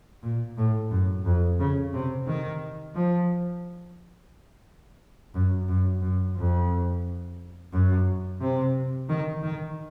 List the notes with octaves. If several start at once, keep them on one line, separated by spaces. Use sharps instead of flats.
A#2
A2
F#2
F2
C#3
C3
D#3
F3
F#2
F#2
F#2
F2
F#2
C3
D#3
D#3